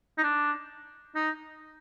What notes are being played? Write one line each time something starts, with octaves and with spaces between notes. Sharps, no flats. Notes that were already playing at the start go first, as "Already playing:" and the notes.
D#4
D4
D#4